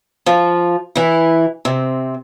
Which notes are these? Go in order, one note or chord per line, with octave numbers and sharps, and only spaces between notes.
F3 F4
E3 E4
C3 C4